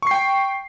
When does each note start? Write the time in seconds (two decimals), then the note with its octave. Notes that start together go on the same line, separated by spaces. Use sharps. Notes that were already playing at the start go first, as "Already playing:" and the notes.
0.02 C#6
0.07 C7
0.11 G5